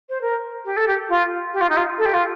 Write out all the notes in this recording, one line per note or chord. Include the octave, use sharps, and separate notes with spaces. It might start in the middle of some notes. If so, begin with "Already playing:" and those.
C5
A#4
G4
A4
G4
F4
G4
F4
D#4
F4
A4
G4
F4